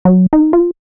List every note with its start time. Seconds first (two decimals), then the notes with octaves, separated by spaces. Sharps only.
0.05 F#3
0.33 D#4
0.53 F4